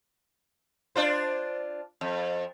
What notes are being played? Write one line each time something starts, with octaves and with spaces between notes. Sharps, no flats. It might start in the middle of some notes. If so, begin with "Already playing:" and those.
D4 F4 C5
F2